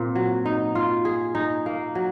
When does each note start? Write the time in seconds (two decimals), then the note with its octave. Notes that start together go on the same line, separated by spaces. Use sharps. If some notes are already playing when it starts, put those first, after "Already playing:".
Already playing: A#2 C4
0.15 F#3
0.46 D#4
0.75 F4
1.05 G#4
1.35 D#4
1.66 A#3
1.95 F#3